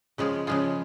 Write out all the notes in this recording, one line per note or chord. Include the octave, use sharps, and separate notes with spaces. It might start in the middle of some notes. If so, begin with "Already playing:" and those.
C#3 F3 G#3 F4 G#4
C#3 F3 G#3 F4 G#4